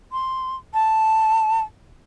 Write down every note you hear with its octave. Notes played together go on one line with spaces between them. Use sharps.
C6
A5